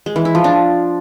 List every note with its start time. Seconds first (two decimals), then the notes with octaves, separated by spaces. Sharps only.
0.06 G#3
0.16 E3
0.25 E4
0.35 F3
0.44 D4